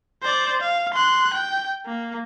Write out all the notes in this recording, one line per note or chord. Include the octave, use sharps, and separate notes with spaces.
C5 D5
F5
C6 F#6
G5
A#3